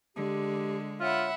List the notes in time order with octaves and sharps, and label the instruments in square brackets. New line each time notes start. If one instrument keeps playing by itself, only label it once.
[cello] D3 G#3 [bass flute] G4
[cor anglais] F4 [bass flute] C#5 [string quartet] E5 F#5 B5